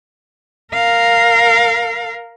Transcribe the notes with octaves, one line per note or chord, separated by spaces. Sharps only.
A#4 F5